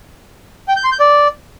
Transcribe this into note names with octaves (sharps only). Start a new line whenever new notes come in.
G5
G6
C6
G6
D5